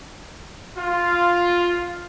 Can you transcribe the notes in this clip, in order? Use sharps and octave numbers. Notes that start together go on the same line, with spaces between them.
F4